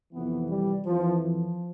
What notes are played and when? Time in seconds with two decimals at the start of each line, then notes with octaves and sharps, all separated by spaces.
0.12 F2 C3 E3 B3
0.49 G3
0.85 F2 E3 F3
1.21 F3